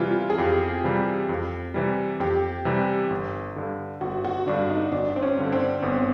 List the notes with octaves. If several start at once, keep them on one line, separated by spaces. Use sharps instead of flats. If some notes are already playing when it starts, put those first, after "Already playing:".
Already playing: C3 E3 G3 E4 F4
G#4
F2 G4
C3 E3 G3
F2
C3 E3 G3
F2 G4
C3 E3 G3
G1
G2 D3
G1 F#4
F#4
G2 D3 D4
D#4
G1 D4
C4
C#4
G2 D3
C4
G1 B3